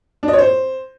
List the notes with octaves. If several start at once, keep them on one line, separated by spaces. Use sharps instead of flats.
D4
D#5
C#5
C5